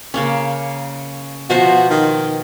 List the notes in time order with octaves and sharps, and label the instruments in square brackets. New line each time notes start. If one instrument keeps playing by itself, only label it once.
[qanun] C#3 A#3 C#4
[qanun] B2 F3 C5 [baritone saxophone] F#4
[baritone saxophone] D#3